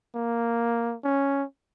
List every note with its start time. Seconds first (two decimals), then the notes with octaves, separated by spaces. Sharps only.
0.15 A#3
1.04 C#4